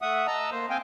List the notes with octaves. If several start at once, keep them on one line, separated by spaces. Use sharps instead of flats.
A3 E5 F#5 D#6
D#5 A5 A#5 E6
A#3 C5
C4 F5 G5 G#5